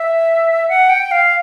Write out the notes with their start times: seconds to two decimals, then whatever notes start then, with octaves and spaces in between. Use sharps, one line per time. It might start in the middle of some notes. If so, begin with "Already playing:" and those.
Already playing: E5
0.69 F#5
0.90 G5
1.11 F5